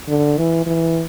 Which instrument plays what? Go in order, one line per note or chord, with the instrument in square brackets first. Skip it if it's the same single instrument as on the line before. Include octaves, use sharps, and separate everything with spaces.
[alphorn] D3
E3
E3